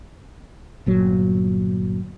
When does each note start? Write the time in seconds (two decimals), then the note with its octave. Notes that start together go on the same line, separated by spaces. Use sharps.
0.86 G1 A#2 F#3